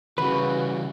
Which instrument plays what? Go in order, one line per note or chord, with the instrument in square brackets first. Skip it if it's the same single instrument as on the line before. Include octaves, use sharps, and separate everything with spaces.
[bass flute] C#3 [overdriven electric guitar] E3 G3 [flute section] F#4 [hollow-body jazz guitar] B4